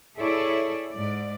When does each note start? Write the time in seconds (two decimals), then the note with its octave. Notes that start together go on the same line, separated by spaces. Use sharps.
0.17 E4 G#4 A4 C#5 D5
0.92 G#2 D5